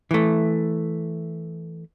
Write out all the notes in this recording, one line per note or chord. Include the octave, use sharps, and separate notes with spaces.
E3 A3